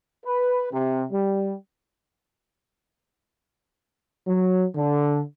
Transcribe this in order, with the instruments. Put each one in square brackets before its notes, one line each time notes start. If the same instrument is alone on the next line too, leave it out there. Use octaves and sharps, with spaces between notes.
[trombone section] B4
C3
G3
F#3
D3